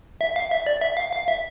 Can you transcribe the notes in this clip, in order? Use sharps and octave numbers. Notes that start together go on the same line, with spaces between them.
E5
F5
E5
D5
E5
F5
F5
E5